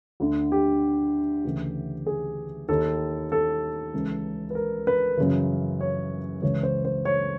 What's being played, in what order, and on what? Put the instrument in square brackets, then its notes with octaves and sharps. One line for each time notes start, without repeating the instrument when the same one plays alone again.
[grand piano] D2 D3
G4
D2 C#3 E3
G#4
D#2 D#3 A4
A4
C#2 C#3 E3
B4
A#4
B4
F#2 C#3 E3
C#5
C#2 C#3 E3 C#5
C5
C5
C#5